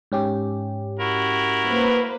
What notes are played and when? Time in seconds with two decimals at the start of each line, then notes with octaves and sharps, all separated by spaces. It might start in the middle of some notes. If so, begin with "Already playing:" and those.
0.12 G#2 C#4 G4
0.99 E4 F#4 A#4
1.66 A#3 B4 C5